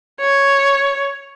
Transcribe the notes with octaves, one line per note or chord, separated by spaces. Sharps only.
C#5